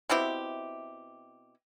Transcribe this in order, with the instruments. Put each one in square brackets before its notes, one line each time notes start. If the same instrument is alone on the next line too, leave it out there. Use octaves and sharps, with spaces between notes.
[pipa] B2 C4 E4 G4